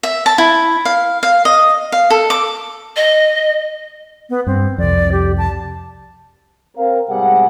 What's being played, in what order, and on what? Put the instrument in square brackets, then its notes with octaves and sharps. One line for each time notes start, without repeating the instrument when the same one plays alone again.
[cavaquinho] E5
A5
E4
F5
F5
D#5
F5
A4
D6
[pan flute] D#5
[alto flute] B3
[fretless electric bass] G2 [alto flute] C4
[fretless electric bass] C2 F2 [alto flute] D5
[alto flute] G4
A5
[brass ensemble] C4 A#4 F5
G#2 B2 G3 C4 G#4 F#5